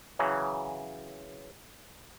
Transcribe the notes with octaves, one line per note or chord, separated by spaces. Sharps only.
C#3 E3 F#3